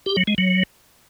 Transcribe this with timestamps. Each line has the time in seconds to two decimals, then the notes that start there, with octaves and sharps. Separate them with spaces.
0.06 G4
0.17 F#3
0.27 G#3
0.38 F#3